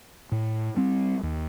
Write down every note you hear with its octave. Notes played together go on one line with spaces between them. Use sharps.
A2
G3 C4
D#2